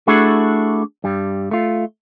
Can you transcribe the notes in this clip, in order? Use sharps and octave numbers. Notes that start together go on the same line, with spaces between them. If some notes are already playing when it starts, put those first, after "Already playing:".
A3 D4 E4 F#4 G#4 A4
G2 G3
A3 F4